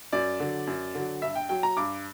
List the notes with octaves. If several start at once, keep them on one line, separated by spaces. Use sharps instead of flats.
F#2 D5
D3 F#3
F#2
D3 F#3
G2 E5
G5
F#3 G5
A#5
G2 D6